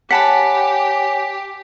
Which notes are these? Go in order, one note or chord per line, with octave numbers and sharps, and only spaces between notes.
G4 C#5 F#5 G#5 A5 B5 B6